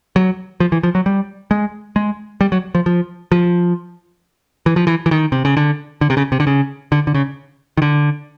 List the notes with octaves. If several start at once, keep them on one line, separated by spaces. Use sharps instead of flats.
F#3
F3
E3
F3
F#3
G3
G#3
G#3
G3
F#3
F3
F3
F3
E3
F3
E3
E3
D#3
C3
C#3
D3
D3
C3
C#3
C3
D3
C#3
D3
D3
C#3
D#3
D3